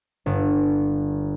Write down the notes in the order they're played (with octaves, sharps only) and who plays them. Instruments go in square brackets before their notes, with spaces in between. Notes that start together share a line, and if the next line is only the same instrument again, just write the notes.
[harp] G1